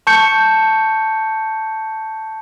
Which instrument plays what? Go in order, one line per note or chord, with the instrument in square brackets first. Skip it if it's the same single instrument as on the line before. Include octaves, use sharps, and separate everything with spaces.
[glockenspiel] A5 C#6 G6 C#7